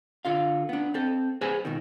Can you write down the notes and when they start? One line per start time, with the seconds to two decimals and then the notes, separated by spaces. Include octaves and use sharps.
0.25 D3 F4 F5
0.69 B3 D4
0.94 C4 A4
1.41 G#4 B4 C5 G#5
1.65 C#2 B2 D#3